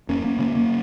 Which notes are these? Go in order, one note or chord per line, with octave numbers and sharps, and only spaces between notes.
F2 A#3 C#4
A#3 C#4
C#3 A#3 C#4
A#3 C#4